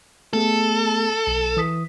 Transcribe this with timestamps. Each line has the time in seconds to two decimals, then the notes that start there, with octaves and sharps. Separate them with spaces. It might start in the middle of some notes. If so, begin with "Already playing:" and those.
0.33 A3 B3 G#4 A4
1.27 B1
1.57 E3 D#6 B6